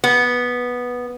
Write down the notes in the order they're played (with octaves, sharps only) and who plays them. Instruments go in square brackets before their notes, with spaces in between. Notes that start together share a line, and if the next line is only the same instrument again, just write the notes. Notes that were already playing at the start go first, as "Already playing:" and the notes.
[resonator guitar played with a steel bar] B3